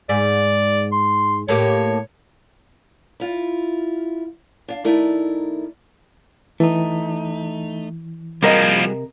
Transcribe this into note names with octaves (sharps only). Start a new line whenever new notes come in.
G#2 D5
C6
A2 A#3 G4 C#5
E4 F4
D4 F5
D#3 A3 D#4 E4 A#4 D5
E3 A3 D#4
C3 F3 G3 A#3 F#4 G#4 A#4 D#5